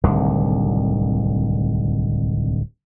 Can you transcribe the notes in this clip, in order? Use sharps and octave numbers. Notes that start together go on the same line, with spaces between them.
D1 C2 D3 D#3